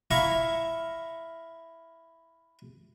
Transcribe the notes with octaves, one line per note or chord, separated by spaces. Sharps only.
E4 F5 A#5 C#6